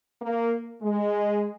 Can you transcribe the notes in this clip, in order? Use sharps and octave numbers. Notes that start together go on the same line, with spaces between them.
A#3
G#3